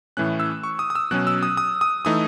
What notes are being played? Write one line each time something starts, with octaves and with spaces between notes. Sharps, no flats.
A2 E3 A3 C#4 F#6
E6
C#6
D#6
D#6
E6
B2 F#3 C#4 F#6
E6
D#6
D#6
D#6
E3 A3 D#4 D#6